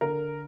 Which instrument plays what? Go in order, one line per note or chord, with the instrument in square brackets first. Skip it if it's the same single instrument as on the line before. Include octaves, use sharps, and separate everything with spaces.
[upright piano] D3 A#4